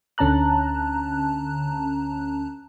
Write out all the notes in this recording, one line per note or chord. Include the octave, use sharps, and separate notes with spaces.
D2 D3 C#4 A5 A#5 F#6